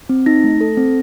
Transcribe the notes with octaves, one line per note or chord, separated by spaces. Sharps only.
C4
D#4 A#6
A3
A4
C4